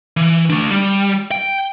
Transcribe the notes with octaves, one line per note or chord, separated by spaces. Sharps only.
E3
A3 D4
G3
G5